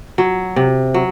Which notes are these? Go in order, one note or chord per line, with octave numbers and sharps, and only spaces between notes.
F#3
C3
F#3